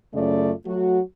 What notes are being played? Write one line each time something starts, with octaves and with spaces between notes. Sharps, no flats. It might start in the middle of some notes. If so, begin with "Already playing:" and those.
F#2 C#3 A3 F4 D5
F#3 A3 F#4